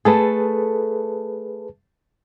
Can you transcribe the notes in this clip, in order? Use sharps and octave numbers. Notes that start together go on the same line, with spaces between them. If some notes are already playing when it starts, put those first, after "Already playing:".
A3 G#4 A4 B4